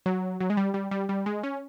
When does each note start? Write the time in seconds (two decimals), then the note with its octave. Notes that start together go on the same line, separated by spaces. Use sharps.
0.06 F#3
0.40 F#3
0.50 G#3
0.57 G3
0.74 G3
0.91 G3
1.09 G3
1.26 G#3
1.43 C#4